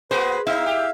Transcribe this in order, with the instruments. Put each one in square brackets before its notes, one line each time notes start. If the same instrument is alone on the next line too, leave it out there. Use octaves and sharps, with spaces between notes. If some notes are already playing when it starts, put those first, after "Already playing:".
[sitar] A#3 F#4 G#4 [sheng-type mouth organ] B4 [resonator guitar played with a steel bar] C5
[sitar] B3 D#4 [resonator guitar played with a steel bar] E4 [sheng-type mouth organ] E5 F5
[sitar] G4